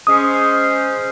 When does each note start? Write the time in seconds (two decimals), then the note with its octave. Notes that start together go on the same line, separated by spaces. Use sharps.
0.07 G#3 C#4 C5 D#6